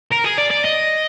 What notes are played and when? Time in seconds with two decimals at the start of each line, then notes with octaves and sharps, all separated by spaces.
0.11 A#4
0.24 G#4
0.38 D5
0.50 D5
0.65 D#5